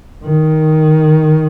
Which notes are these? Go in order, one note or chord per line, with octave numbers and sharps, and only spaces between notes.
D#3